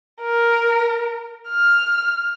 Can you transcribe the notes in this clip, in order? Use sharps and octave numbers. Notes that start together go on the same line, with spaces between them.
A#4
F6